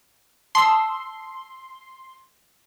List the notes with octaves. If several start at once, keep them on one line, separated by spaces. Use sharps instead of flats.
A5 C6 D#6 E6